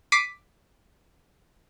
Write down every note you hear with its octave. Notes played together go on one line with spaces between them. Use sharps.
D6 B6 C7 D7 D#7